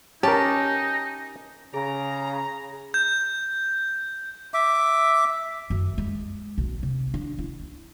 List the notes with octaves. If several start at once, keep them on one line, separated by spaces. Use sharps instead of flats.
C#4 D#4 G4 A#4 A5
C#3 G#4 A#5
G6
E5 D6
F#2
G#3
B1
C3
D4
E4